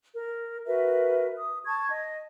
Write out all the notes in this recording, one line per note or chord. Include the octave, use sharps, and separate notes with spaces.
A#4
F#4 A#4 B4 E5
D#6
A5 C#6 G#6
D#5